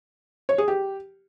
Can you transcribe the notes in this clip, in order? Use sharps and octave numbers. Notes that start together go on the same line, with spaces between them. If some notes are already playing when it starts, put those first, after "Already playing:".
C#5
G#4
G4